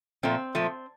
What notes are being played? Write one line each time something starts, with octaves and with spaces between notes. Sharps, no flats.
A#2 F3 A3 C4
A#2 F3 A3